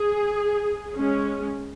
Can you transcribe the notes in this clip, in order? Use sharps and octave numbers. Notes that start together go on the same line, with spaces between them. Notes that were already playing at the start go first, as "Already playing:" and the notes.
Already playing: G#4
G#3 C#4